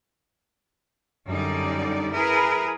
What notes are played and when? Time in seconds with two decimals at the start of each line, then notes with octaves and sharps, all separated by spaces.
1.28 F#2 D3 G3 D#4 D5
2.14 E4 G#4 A#4 B4